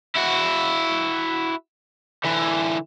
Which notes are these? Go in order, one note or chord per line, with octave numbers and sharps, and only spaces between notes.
E4 F#4
D3 E3